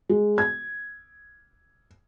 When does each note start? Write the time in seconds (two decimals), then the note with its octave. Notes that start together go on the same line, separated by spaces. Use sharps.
0.09 G#3
0.38 G#6